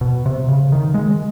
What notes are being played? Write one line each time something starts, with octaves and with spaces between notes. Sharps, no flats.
B2
C3
C#3
D#3
G#3